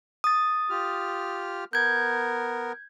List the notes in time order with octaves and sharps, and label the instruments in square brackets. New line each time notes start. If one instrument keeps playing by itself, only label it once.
[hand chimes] D#6 A6
[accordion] F4 G4 F6
[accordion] B3 A#4 [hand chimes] G6 G#6